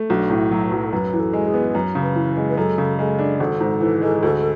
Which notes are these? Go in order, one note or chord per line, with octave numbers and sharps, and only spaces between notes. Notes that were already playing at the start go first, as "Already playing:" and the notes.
Already playing: A3
B1 D4
A2
E4
F#3
B4
B1
A4
F#2 B4
E3
A4
G#3
G#4
B3
F#2
C#3
B4
E3
G#3
B4
F#2 A4
C#3
G#3 A4
D4
G#1 A4
G#2
E3
G#3
D2